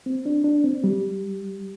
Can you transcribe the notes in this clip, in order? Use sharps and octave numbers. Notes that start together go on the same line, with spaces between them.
C4
D4
D4
C4
G3